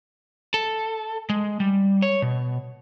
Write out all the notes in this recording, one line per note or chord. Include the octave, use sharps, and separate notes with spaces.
A4
G#3
G3
C#5
B2